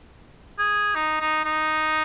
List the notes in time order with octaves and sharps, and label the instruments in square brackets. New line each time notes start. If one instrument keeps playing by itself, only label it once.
[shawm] G#4
D#4
D#4
D#4